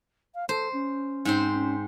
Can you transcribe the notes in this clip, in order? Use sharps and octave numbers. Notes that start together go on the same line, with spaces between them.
F5
A4 C5
C#4
G#2 C4 C5
C#4